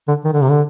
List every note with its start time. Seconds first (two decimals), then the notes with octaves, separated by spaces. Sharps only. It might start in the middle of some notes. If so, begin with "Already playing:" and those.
0.08 D3
0.24 D#3
0.33 D3
0.42 C3
0.50 D3